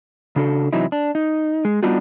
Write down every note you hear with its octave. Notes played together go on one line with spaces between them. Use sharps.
C#3 D4 F#4 A4
C3 E3 F#3 D#4 E4
D4
D#4
G#3
G3 B3 D4 D#4 F4 F#4